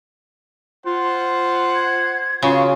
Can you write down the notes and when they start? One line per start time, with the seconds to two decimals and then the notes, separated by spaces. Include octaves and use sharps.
0.86 F4 C5 F#5
1.75 G#6
2.43 C#3 B3 F4 F#4 C6 C#6